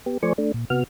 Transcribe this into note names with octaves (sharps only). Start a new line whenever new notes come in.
B3 G4
F3 A3 C5 D5 G#5 C#6
A3 D4
A#2
C3 B3 F#4 F6